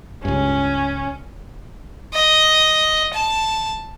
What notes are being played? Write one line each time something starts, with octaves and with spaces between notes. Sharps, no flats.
C#2 G2 C#4
D#5
A5